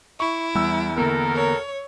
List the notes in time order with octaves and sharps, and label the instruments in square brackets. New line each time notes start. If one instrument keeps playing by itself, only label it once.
[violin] E4 [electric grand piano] C#6
[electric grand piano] E2 E6 [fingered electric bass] G3
[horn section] B2 A4 A#4 [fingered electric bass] D3 A#3 B3
[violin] C#5